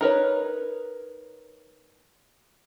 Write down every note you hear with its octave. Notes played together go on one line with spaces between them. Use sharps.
D#4 A#4 B4 C#5